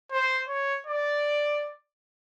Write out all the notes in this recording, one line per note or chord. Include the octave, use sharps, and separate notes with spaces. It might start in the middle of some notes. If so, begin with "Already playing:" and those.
C5
C#5
D5